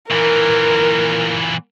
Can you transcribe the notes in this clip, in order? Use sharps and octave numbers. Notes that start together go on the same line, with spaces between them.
A#2 E3 A#4